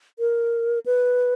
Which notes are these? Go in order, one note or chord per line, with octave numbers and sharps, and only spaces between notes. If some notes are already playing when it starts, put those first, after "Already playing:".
A#4
B4